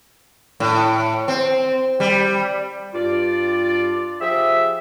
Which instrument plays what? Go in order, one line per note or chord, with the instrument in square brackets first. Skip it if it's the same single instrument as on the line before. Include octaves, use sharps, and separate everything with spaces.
[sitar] A2
C4
G3
[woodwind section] G2 F4 D5
F3 G4 G#4 E5